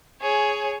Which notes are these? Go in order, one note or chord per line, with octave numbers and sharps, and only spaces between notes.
G#4 C#5